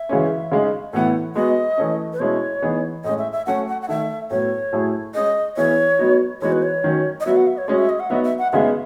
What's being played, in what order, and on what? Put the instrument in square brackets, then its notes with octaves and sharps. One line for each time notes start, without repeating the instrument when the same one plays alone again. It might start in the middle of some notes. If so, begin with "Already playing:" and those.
Already playing: [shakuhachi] E5
[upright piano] C#3 E3 G#3 C#4
C#3 G#3 D#4
[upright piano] A2 E3 B3 E4 [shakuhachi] F#5
[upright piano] G#3 B3 F#4 [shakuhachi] D#5
[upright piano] E3 A3 C#4
[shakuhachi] B4
[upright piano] B2 G#3 C#4 E4 [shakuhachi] C#5
[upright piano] E3 B3 D#4 G#4
[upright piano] A2 G#3 C#4 [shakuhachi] D#5
[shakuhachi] E5
E5
[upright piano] F#3 A3 C#4 F#4 [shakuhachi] F#5
[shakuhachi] F#5
F#5
[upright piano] D#3 A3 D#4 [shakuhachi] E5
[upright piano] A2 F#3 B3 [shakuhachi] C#5
[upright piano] A2 F#3 A3 E4 G#4
[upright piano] G#3 C#4 G#4 [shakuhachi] D#5
[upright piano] E3 B3 E4 G#4 [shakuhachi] C#5
[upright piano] F#3 B3 D#4 F#4
[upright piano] E3 G#3 B3 D#4 F#4 [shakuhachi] C#5
[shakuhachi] B4
C#5
[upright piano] D#3 F#3 C#4
[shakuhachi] D#5
[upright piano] F#3 B3 F#4 [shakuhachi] E5
[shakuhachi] F#5
E5
C#5
[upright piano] G#3 C#4 F#4 [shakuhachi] D#5
[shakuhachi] E5
D#5
F#5
[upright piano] F#3 B3 D#4 F#4 [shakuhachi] E5
[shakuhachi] E5
F#5
[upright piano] C#3 G#3 B3 D#4 G#4 [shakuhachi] E5